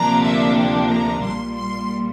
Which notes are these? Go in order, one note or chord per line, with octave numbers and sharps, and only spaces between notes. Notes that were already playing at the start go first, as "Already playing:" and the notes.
Already playing: D2 C3 F3 A#3 D4 A#5
E5
G5
A#5
A#1 A#2 G3 C6
C6